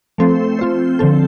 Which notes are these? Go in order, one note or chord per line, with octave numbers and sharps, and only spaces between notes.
F3 A3 C4 A4 C5
C4 F4 C5
D3 F3 C4 A4